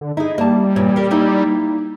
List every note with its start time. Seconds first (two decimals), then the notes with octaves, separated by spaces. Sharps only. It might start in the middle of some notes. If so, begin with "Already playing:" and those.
0.01 D3
0.17 D#4 E4 G#4
0.38 G3 A#3 A5
0.76 E2 A#2 C#5
0.96 G4 A#4
1.11 A#3 D#4 E4